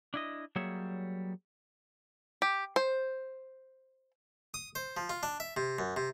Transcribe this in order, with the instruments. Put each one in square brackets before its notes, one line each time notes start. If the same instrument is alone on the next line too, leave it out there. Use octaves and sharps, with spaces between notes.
[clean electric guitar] D4 E4 D#5
F#3 G3 A#3 G#4 C#5 E5
[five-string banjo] G4
C5
[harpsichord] D#6
C5
F3
F4
D4
E5
C3
F#2
C3